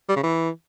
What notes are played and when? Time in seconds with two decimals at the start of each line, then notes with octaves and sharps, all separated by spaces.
0.09 G3
0.16 C#3
0.23 E3